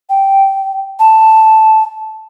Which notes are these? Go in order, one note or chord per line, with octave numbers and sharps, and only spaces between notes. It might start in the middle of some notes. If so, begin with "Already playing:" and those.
G5
A5